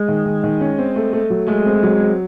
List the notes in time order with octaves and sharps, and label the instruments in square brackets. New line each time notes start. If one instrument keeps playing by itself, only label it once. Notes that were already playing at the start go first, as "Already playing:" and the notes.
Already playing: [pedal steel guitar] G#3
[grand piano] D#3
D#3
D#3
C#4
C4
A3
A3
F#3
[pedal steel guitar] G#3 [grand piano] A3
[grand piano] C4
F#3
C4